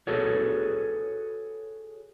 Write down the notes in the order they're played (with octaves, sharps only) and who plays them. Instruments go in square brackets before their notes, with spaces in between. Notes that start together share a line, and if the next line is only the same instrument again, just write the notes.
[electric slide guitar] F#4 G#4 A4 B4 C#5